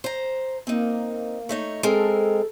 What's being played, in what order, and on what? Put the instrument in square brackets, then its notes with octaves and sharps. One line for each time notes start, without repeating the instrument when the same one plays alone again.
[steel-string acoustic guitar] C5 A#5
[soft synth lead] A#3 [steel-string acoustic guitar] C4 D#4
[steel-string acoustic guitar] A3 D#4 C#5
[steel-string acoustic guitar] G#3 C4 A#4 [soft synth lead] A4